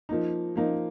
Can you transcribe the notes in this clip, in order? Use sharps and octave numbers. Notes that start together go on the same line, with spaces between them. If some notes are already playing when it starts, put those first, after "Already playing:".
F3 A#3 D#4
F3 A#3 D#4